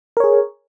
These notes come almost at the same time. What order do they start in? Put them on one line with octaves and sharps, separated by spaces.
A#4 C#5 G#4